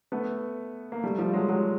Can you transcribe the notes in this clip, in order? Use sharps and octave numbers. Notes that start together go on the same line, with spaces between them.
A3 B3
A#3
G3 A3
F3 G3
F#3 G#3
F#3 G#3